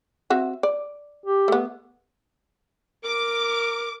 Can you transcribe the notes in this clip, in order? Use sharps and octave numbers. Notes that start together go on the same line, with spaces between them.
C4 F#4 E5
D5
G4
A3 B3
A#4 D6